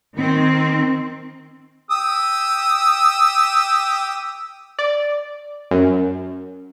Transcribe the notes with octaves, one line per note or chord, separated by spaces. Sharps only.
D#3 C4
G4 D#6 E6
D5
F#2